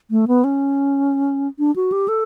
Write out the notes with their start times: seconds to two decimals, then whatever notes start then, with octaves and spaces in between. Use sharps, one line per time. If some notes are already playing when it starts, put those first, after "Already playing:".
0.11 A3
0.28 B3
0.44 C#4
1.59 D4
1.76 F#4
1.92 G4
2.08 A4